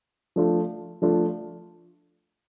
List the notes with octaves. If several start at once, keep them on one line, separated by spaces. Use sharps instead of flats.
F3 A3 D4 F4
F3 A3 D4 F4